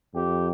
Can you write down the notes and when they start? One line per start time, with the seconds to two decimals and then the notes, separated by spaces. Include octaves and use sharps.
0.15 F2 G4